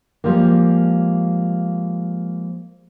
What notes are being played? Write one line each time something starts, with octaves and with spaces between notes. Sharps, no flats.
F3 G3 G#3 A#3